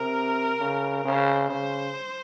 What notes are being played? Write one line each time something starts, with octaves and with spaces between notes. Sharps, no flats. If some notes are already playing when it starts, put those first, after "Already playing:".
Already playing: C3 A#4
C#3
C#3 C5
C#3 C5